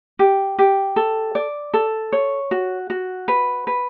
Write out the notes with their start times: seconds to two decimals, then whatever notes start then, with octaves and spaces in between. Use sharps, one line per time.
0.19 G4
0.59 G4
0.96 A4
1.35 D5
1.74 A4
2.12 C#5
2.51 F#4
2.90 F#4
3.28 B4
3.67 B4